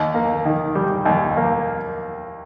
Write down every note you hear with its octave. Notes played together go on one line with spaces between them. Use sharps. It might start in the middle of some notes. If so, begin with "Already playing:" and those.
Already playing: D#2
A#3
D#3
G3
D#2
A#3